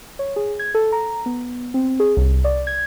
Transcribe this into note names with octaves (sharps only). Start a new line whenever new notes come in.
C#5
G#4
G#6
A4
A#5
B3
C4
G#4
C2
D5
G#6